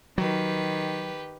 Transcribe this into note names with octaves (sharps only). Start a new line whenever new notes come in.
D#3 F#3 G4 B4